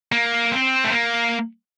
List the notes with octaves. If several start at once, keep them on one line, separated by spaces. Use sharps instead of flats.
A#3
C4
A3
A#3